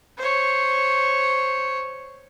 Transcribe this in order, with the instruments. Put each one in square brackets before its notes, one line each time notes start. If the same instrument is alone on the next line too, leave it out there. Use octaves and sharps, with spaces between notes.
[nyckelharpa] C5 C#5